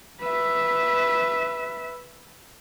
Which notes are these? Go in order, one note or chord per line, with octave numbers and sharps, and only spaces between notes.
B4 E5